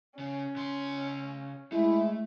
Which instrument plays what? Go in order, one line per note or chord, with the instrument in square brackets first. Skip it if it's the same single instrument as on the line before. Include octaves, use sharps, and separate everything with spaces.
[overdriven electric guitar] C#3 [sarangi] C#4
[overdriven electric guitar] C#3 C6
[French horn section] G#3 E4 [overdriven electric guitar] A3